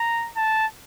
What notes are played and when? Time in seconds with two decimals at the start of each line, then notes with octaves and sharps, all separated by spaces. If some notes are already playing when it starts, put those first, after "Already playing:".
Already playing: A#5
0.36 A5